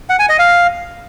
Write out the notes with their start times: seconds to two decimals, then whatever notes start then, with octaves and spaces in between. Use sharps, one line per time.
0.09 F#5
0.19 G#5
0.29 D#5
0.39 F5